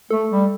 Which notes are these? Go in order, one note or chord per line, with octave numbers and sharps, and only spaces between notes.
A3 A4
G3